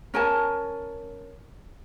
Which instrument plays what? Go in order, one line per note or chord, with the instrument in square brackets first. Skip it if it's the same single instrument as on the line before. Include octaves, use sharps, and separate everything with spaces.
[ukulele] C#4 A#4 G#5 A5